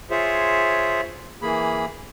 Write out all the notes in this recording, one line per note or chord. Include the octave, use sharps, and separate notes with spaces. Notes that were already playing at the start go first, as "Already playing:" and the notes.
F4 G#4 C5 C#5 E5
E3 A#3 G#4 B5